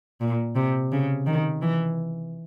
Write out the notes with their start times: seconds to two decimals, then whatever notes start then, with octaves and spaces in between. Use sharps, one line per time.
0.21 A#2
0.56 C3
0.92 C#3
1.27 D#3
1.62 E3